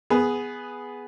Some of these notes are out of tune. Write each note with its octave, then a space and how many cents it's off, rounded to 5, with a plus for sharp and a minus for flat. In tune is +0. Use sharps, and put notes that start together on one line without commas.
B3 +0 G#4 +0